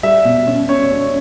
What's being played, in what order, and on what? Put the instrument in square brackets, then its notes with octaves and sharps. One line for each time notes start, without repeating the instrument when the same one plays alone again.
[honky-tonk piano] G3 [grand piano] E5
[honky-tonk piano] B2
C#4
[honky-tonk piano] C#4 [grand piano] C#5
[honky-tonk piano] C#4